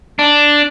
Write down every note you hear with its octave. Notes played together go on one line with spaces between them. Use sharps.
D4